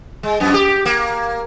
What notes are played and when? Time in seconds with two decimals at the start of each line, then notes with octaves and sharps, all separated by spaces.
0.23 G#3
0.40 F#2 F3 B3
0.54 G4
0.86 A#3